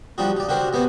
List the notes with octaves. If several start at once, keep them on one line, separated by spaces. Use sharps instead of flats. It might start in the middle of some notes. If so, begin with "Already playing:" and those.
F3 G3 D4 D#4 F#4
D#4 D5
D4 F#4 G4 A#4 C5
C3 B3 F#4 C5